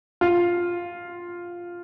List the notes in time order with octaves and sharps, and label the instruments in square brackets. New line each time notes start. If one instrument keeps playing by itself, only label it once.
[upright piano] F4